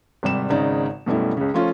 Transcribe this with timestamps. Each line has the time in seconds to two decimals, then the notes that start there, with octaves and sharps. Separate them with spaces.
0.23 G#1 C3 G3 E7
0.50 G#1 C#3 D#4 D5 A#5
1.06 F#2 B2 G3 A3 E4
1.37 C#2 C#3
1.54 F3 A3 C#4 F4